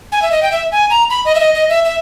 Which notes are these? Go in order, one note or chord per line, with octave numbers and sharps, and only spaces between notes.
G#5
E5
D#5
G5
E5
G#5
A#5
B5
D#5
E5
D#5
D#5
E5
E5